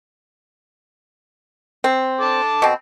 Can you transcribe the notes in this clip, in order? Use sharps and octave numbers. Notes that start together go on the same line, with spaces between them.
C4
A4 A5 D6
B2 C4